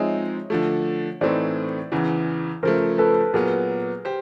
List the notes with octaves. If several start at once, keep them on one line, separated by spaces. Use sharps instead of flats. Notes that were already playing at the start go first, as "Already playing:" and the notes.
Already playing: F3 G#3 C4 D#4 G#4 C#5 D#5 E5
D3 F3 A3
A2 E3 A3 C4 D#4 C5 D5
E2 C#3 E3
C#3 F3 A3 A#4 C5
A4 B4
A#2 F#3 B3 G#4 A#4
G4 C5